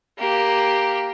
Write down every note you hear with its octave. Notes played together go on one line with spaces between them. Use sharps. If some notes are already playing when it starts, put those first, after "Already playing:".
A#3 G4